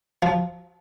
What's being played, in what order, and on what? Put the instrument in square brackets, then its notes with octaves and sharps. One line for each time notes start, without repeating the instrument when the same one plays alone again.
[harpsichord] F3